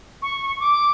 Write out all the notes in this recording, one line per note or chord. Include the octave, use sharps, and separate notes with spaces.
C#6
D6